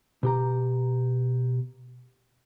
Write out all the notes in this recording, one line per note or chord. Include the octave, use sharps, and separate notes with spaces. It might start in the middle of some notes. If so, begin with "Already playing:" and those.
B2 G4 A#5